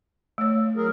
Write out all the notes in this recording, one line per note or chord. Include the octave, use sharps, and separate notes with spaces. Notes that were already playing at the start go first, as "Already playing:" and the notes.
A3 C#5
F#3 G#4 A#4